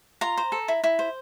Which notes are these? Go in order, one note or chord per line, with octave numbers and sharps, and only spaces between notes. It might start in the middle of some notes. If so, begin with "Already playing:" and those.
F4 A#5
C5
A4
E4
E4
C5